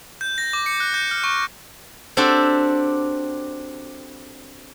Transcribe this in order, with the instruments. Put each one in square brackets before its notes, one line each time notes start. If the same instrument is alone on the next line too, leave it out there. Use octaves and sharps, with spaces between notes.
[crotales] G6
A#6
D6
C#7
F#6
G6
F6
C#6
[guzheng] C4 D4 F#4 G4 A4